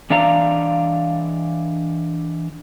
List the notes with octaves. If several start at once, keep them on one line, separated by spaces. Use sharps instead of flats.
E3 D4 D5 F5 A#5